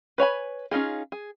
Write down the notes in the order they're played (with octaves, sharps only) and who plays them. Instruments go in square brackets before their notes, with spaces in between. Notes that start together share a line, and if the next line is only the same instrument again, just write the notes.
[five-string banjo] B4 C#5 G#5 B5
C#4 D#4 F4 G#4
G#4